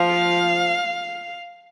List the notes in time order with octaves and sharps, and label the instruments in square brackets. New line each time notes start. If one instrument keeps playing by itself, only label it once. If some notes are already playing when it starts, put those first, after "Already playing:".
Already playing: [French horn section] F3 [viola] F5